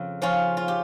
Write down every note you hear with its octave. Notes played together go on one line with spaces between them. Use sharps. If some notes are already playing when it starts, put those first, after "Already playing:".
Already playing: F2 C#3
F3 C#4 F4
F4
G4